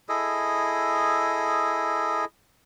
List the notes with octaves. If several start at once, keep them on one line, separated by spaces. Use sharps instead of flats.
E4 G#4 A4 D#5